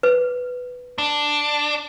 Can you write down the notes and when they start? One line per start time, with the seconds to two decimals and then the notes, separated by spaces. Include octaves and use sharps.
0.03 B4
0.98 D4